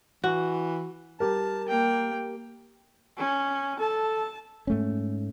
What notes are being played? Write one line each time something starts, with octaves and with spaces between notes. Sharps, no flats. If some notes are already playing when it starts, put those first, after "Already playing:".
E3 F#4
G3 G4 A#4 A5
A#3 G5
C#4
A4 A5
G#2 A3 C#4